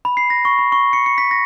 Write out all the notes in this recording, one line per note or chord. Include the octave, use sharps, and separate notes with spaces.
B5
C7
A#6
C#6
B5
C#6
C#7
C#7
B6
A#6